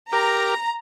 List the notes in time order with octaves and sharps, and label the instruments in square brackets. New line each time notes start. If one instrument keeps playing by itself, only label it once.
[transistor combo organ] G4 A#4 [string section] A#5